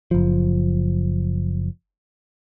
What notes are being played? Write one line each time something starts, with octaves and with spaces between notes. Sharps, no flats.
F#1 F3